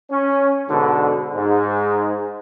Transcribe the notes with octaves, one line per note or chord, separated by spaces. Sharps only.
C#4
G#2 B2 D3
G#2